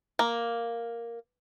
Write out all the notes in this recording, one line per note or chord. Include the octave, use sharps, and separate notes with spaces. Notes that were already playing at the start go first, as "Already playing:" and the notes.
A#3